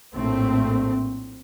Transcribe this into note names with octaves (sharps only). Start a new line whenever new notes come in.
A#1 A2 A3 C4